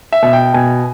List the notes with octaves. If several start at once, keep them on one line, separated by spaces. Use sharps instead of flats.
E5
B2
G5
B2 G#5